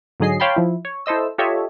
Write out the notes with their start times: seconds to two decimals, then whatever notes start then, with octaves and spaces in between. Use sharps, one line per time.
0.20 G#2 D3 F#3 G#4 D#5 C7
0.40 C#5 F5 G5 A5 B5 C6
0.56 F3 E4
0.85 C#5
1.06 E4 A4 C5 D#5 E6
1.38 F4 G4 A4 C#5 D#5 E5